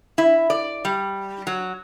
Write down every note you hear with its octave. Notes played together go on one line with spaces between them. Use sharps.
E4
D5
G3
F#3